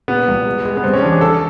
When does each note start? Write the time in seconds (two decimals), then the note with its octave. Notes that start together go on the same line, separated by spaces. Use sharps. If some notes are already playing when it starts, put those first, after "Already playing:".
0.08 A#2 B3
0.28 C2
0.46 G#3
0.65 G#3
0.77 B3
0.84 G2 C4
0.93 C#4
1.02 E3 D4
1.12 G#4
1.21 E3 A4